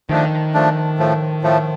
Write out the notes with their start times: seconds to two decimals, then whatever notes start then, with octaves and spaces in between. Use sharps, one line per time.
0.09 D#3 F3 A3 D4
0.54 F3 A3 D4
0.98 A2 F3 A3
1.42 A2 F3 A3